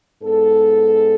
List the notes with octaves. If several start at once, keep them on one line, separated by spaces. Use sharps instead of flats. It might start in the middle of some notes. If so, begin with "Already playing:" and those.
G#2 G#3 B3 A4